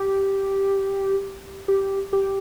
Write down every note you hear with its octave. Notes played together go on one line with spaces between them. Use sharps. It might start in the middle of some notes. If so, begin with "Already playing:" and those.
Already playing: G4
G4
G4